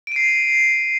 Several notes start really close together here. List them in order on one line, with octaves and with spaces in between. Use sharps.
D7 D#7 C7